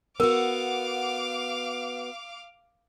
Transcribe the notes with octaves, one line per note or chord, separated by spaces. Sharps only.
B3 F#4 A#4 F5 D6